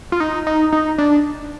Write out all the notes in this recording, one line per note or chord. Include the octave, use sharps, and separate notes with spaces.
F4
D#4
D#4
D#4
D4